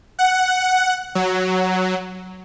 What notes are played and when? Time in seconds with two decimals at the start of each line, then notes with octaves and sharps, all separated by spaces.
0.19 F#5
1.15 F#3